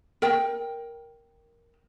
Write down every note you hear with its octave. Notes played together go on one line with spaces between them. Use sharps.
A#4 G5